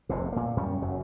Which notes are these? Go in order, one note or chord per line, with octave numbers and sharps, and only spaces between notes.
F1 E2 C3
A#2 A#3
F#2 G3 C#4
F#1 F#2 C#3 F#3